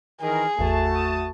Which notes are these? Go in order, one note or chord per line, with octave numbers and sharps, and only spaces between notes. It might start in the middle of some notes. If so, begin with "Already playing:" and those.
D#3 E3 G#4 A#4
G#1 E2 A3 F#4 A5
D#6